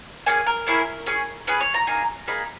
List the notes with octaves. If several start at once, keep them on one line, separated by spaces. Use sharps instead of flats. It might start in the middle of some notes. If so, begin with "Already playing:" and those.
A#3 C#4 G#4 G#5
A#4
A#3 C#4 E4 G#4
C#4 G#4
C#4 G#4 B4
C#5
A#5
A#3 D#4 G#4
A#3 D#4 G#4 B5